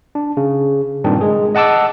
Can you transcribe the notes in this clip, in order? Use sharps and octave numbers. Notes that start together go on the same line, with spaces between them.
D4
C#3
G2 A#2 D#3 C4 D4
G#3 G#4
D#5 F#5 A5 D6 E6